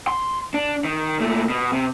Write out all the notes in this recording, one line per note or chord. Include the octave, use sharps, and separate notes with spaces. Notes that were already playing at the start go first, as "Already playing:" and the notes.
C6
D4
D#3
A#2 A3
B2
C3